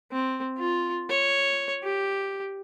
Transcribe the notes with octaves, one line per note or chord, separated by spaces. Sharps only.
C4
F4
C#5
G4